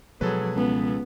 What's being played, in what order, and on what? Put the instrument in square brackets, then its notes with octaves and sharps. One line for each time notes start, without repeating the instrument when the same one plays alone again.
[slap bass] B2 F3 G#3 [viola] F#3 [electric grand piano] G#4 A4 B4
[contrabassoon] C#2 [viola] B3